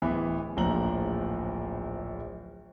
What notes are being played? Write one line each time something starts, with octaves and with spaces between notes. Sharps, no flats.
D1 E3 B3 B5
D1 A#1 A2 F3 A#5 F#7